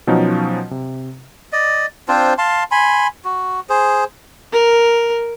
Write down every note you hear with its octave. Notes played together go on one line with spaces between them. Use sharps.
B2 F3 F#3 C#4 D#4 F#4
C3
D5 D#5
C4 D4 F4 C5
F5 A5 C6
G#5 B5 C6
F#4
G#4 C5
A#4